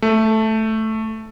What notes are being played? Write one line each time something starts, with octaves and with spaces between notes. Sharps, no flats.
A3